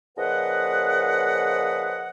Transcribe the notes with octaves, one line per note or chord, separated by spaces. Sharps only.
A#2 C#3 F3 B4 D#5 F#5